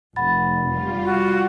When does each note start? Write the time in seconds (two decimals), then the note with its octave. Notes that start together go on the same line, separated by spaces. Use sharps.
0.16 F1 F#5 B5 A6
0.65 G3 F4
1.04 F#4